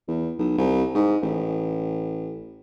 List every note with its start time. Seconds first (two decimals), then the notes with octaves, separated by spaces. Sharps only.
0.08 E2
0.38 B1
0.58 C2
0.95 G#2
1.22 A1